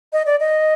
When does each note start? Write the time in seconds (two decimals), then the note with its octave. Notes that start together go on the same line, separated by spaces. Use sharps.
0.13 D#5
0.26 D5
0.40 D#5